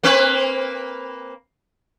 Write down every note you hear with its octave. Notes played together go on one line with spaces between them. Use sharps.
A#3 C4 B4